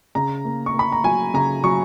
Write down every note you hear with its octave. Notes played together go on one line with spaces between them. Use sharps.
C#3 A#5
A#3
C#6
A#3
B5
A#5
F#3 G#5
C#3 A#5
F#3 C#6